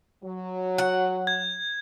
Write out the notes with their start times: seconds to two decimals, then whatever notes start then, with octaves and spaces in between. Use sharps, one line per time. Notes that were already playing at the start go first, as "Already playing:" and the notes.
0.24 F#3
0.78 F#5
1.27 G#6